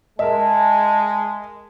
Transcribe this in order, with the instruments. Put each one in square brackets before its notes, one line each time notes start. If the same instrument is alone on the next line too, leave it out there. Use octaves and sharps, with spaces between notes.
[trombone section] G#3 [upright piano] A#4 E5 [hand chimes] D#5 [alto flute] A5